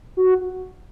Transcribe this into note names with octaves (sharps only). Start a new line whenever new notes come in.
F#4